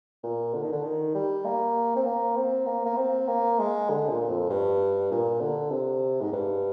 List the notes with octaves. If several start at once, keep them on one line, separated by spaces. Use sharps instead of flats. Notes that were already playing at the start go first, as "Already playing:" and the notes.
A#2
D3
D#3
D3
D#3
G3
A#3
C4
A#3
C4
A#3
A#3
C4
A#3
G#3
D3
A#2
F2
G2
A#2
D3
C3
G#2
G2